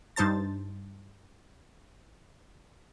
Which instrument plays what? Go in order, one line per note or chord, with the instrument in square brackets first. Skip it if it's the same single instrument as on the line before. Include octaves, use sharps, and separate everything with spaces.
[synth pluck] G2 D#4 C5 A5 A6